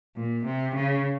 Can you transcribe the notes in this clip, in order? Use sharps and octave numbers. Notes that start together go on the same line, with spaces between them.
A#2
C3
C#3